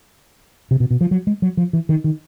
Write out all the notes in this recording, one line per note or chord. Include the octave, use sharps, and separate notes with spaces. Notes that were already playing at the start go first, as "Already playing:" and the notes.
C3
B2
B2
F3
F#3
G#3
F#3
F3
E3
D#3
D#3